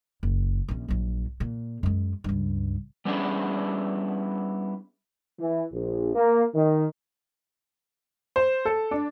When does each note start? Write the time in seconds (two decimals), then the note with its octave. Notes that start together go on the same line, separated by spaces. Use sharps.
0.23 F#1
0.68 A#1 C#4
0.88 A#1 F#3
1.40 A#2
1.83 F#2 G#3
2.24 C#2 G2
3.05 G3 B3 C#4 D4 E4 G#4
5.40 E3
5.72 A#1
6.15 A#3
6.55 D#3
8.36 C5
8.65 A4
8.91 D4